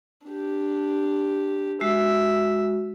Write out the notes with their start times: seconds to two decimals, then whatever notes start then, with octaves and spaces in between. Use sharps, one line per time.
0.26 D4 G4
1.81 G#3 F#4 E5